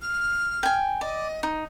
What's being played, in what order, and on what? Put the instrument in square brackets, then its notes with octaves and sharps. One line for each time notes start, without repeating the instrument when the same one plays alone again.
[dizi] F6
[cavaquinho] G5 G#5
[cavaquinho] D5 [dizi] D#5
[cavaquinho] D#4